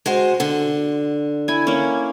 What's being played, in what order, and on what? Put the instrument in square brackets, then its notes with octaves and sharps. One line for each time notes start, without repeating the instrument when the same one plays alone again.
[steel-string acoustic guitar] G#3 F#4 C5
D3
[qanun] E4 G#5
A#3 C#4